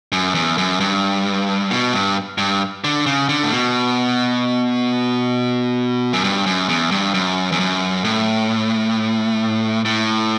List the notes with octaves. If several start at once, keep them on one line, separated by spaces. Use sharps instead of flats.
F#2
E2
F#2
G2
B2
G2
G2
D3
C#3
D3
A2
B2
F#2
G2
F#2
E2
G2
F#2
E2
F#2
A2
A2